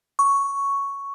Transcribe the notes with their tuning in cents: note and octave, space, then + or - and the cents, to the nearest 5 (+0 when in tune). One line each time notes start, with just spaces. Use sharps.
C#6 +5